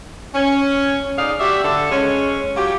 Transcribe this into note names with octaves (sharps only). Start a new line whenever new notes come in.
C#4
A2 D#4 G#4 D5 F5
F#4 G4 D5 E5
D3 A4
G#3 C#4
F#3 F4 G4